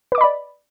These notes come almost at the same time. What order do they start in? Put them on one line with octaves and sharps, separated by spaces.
B4 D6 D#5 B5 D5